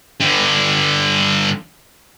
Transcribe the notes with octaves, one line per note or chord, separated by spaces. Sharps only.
G2 D3